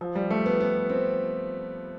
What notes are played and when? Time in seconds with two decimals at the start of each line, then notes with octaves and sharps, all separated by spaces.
0.01 F3
0.15 G3
0.31 A3
0.46 B3
0.60 B3
0.89 C4